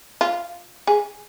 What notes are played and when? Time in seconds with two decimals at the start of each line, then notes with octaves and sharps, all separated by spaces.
0.21 F4
0.87 G#4